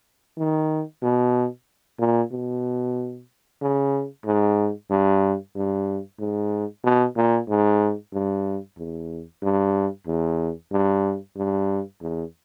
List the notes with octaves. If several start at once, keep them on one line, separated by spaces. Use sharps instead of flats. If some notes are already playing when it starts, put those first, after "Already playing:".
D#3
B2
A#2
B2
C#3
G#2
G2
G2
G#2
B2
A#2
G#2
G2
E2
G2
E2
G2
G2
E2